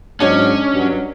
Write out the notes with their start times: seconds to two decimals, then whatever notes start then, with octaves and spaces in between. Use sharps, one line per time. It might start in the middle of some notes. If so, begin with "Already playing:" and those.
0.20 G#2 F#3 C#4 D4 C#5 D#5
0.74 G2 F#3